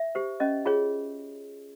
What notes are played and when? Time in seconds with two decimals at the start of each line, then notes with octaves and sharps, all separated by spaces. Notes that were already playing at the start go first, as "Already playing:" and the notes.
Already playing: E5
0.15 G4 C5
0.40 C#4 D#5
0.65 F4 G#4 C#5